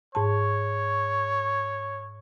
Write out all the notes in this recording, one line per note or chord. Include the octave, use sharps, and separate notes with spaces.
G#2 C#5 A5